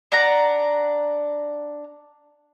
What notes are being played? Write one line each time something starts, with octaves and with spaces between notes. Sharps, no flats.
D4 F#5 A#5